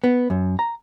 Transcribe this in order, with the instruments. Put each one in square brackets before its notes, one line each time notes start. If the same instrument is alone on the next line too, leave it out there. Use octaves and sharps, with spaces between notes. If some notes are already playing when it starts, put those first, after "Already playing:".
[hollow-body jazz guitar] B3
F#2
A#5